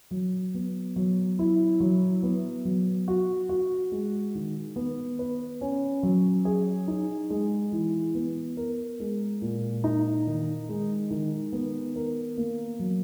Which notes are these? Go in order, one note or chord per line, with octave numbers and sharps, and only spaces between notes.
F#3
B3
F#3
E4
F#3
B3
F#3
F#4
F#4
G#3
D#3
B3
B4
C#4
F#3
G#4
D#4
G#3
E3
B3
A#4
G#3
A#2
D#4
D#3
G#3
D#3
B3
A#4
A#3
F#3